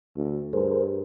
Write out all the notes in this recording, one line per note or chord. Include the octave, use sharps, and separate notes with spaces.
D2
G2 G#4 A#4 C5